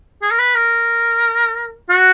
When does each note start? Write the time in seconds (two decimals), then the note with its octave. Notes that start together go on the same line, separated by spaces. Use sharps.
0.22 G#4
0.31 A#4
0.39 B4
0.55 A#4
1.89 F#4